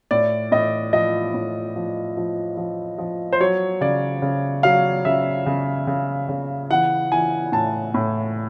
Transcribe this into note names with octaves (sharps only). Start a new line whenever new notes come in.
A2 D5
A2 D#5
F3 D#5
A2
F3
F3
F3
F3
C5
F#3 C#5
C#3 D5
C#3
F#3 F5
C#3 E5
C#3
C#3
C#3
E3 F#5
E3 G#5
A2 A5
A2